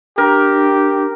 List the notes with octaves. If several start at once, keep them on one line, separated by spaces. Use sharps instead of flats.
D4 G4 A#4